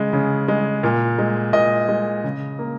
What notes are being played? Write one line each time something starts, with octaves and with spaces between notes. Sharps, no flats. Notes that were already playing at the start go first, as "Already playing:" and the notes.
Already playing: C#3 G#3
C#3
G#3
A#2
G#3
A#2 D#5
G#3
C#3
A#3